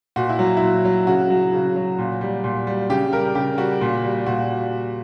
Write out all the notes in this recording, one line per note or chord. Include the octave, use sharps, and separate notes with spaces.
A#2 F#4
E4
F#3
A#2 E4
F#3
C#3 F#4
F#3
C#3
F#3
A#2
G3
A#2
G3
C#3 G4
G3 A#4
C#3 G4
G3 F#4
A#2
G3
A#2 F#4